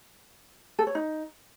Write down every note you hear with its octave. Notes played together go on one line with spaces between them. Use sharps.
A4
C#5
D#4